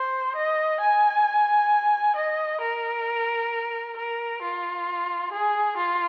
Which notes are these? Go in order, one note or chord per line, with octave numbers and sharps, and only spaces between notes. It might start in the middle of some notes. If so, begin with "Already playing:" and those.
Already playing: C5
D#5
G#5
D#5
A#4
A#4
F4
G#4
F4